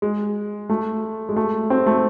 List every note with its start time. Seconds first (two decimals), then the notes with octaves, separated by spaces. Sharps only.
0.02 G#3
0.69 A3
1.29 G#3
1.36 A3
1.70 C4
1.86 A3